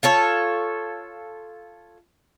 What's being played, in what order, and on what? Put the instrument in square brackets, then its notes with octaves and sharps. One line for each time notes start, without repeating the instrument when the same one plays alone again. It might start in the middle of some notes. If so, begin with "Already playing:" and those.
[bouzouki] F4 A4 C#5